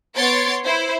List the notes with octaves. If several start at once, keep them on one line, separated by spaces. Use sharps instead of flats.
B3 C#5 C6 A6 D7
E4 C5